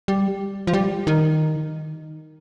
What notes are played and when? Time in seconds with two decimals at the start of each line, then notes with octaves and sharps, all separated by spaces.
0.08 G3
0.67 F3
0.73 G3
1.07 D#3